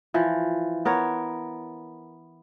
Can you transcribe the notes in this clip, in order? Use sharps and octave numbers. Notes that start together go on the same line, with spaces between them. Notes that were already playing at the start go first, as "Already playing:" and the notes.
E3 F3
B3 A#4 C#5